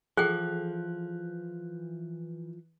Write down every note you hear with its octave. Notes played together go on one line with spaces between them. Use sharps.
E3 F3 G#4 A4 G5 F#6